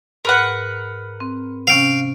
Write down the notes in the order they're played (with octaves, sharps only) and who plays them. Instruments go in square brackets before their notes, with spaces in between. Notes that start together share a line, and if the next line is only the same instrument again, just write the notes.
[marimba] G#2 F6 [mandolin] A#4 B4 F#5
[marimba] C4
[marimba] C3 C#4 [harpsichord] F5 G5